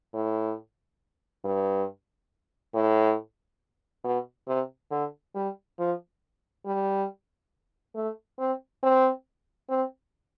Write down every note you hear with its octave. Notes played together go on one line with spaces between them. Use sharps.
A2
G2
A2
B2
C3
D3
G3
F3
G3
A3
C4
C4
C4